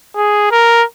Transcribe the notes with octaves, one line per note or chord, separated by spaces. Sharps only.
G#4
A#4